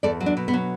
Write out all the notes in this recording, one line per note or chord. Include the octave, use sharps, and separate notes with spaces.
E2 A4 D5
F#3
D4
B2
B3
F#3